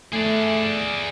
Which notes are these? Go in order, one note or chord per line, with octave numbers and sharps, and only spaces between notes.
A3 G#4 D5